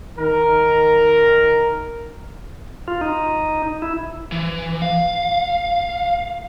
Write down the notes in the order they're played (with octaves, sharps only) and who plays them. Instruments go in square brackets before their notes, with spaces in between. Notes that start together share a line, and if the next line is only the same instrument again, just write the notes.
[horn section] D#3 A#4
[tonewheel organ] F4
D#4
E4
[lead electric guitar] E3
F5